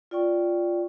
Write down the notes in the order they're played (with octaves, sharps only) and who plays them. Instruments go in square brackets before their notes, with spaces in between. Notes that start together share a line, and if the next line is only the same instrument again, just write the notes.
[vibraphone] F4 D5 G5 C#6